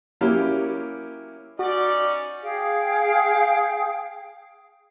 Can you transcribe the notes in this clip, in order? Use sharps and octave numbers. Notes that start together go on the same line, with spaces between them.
F#3 A#3 C#4 E4 G4
C#4 D#4 F#4 D5
G#4 F5 G5